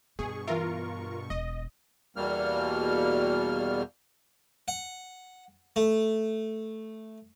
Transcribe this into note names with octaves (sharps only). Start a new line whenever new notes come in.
G2 B2 B3 G#4 C#6
E3 F4 A#4 E5
E1 D#5
E2 B2 G3 A#3 F6
F#5
A3